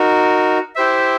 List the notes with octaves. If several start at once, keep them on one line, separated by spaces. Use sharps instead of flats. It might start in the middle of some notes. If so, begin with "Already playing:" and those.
Already playing: D#4 F#4 A#4
E4 G4 C5 E5